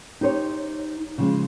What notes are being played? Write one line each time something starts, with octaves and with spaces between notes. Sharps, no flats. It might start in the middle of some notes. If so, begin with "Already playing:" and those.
D#4 G4 C5 C#5
C#3 F3 G#3